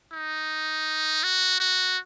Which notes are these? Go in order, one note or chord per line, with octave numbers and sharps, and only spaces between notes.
D#4
F#4
F#4